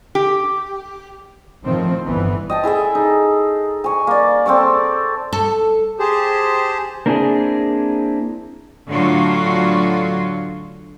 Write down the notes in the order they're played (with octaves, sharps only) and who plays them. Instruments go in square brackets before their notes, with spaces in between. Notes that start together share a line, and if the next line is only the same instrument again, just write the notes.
[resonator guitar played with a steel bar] G4
[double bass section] A2 D#3 F3 C4
G1 E3 B3
[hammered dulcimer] D#5 G5 A5
E4 G#4 A4 E5
D#4
G#5 C#6
A#3 D5
C4 A4 D5 C#6
[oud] A4
[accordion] G4 G#4 C5 A5
[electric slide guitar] A#3 C4 D4 E4 F4 G#4
[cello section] A2 D3 F#3 F4 F#4